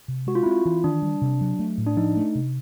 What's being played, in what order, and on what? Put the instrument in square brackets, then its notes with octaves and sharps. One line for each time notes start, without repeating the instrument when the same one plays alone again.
[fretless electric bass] C3
[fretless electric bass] G#3 [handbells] F#4
[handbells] F4
[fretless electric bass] C4 [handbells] E4
[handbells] F4
[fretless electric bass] E3
[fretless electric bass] D#3 [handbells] D4
[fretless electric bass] G3
C3
F#3
A3
A2
[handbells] D4
[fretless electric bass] F3 [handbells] D#4
[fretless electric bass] A3
C3